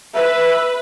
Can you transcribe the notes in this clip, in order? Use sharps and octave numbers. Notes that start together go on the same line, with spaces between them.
B4 E5